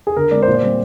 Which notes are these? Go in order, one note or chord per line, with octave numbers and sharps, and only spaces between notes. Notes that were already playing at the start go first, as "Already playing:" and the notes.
G#4
D3 A#4
G#3 C4 D5
C5
A#2
D5
G3 C4